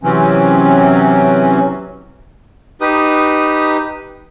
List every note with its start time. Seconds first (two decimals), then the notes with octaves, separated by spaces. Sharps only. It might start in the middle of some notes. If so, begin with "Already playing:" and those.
0.03 C3 E3 F#3 C4 C#4
2.81 D#4 G4 B4 D#6